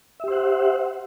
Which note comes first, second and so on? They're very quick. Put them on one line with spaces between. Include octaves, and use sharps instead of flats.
E5 G4 C5 F#5